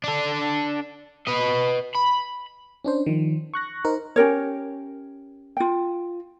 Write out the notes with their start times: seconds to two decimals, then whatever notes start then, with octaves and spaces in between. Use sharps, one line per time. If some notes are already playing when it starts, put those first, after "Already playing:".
0.04 D4 A4
1.27 B4 D#5
1.95 B5
2.84 C#4 D4 C5
3.06 D#3 F3
3.54 C#6 F#6 A#6
3.84 D#4 A#4 C5
4.16 C#4 G4 A#4 C#5
5.57 F4 G5